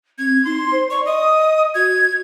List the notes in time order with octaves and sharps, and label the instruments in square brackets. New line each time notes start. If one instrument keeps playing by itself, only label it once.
[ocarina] C4 [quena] G#6
[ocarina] D#4 [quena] C6
[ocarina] C5
[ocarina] D5 [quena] C#6
[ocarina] D#5 [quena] D#6
[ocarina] F#4 [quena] G#6